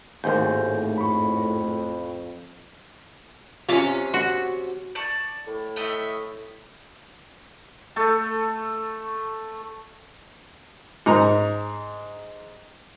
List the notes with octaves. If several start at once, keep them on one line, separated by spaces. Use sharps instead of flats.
G#1 D#2 A2 A3 C5 G#5 G6
F2 B5 C#6
C3 F3 C#4 D5 D6
F#4
D5 A5 C#6
A2
A3 D#5 E5
A3 A4
G#2 A#5